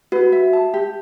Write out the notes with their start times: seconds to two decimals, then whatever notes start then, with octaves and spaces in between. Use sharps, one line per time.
0.12 F#4 B4
0.32 E5
0.53 A5
0.74 G4